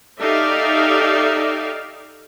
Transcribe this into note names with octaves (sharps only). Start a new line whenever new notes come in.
D#4 G4 A4 D5 E5 F5